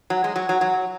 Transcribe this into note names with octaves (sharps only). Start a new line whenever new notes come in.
F#3
G#3
F#3
F#3
F#3